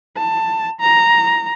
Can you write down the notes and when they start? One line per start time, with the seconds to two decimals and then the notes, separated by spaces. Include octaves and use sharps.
0.17 A5
0.81 A#5